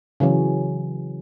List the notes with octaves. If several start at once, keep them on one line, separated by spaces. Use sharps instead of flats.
C#3 E3 F#3 C#4